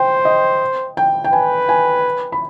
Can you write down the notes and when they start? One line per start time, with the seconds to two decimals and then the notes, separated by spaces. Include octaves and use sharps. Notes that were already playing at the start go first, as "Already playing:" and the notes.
Already playing: C5 G5
0.25 D#5
0.97 G5
1.24 G5
1.33 B4 G#5
1.69 G#5
2.32 B5